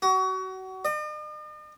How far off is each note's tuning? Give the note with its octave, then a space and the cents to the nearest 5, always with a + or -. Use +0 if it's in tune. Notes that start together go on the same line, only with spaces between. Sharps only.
F#4 +30
D#5 -45